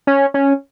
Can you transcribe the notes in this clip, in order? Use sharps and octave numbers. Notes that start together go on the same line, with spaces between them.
C#4
C#4